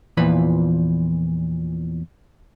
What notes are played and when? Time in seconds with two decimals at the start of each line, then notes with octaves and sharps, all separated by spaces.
0.17 E2 A#2 E3 F3 B4 B5